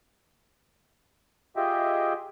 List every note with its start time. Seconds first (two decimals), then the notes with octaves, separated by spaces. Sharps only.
1.56 F4 G4 G#4 D#5 E5 G5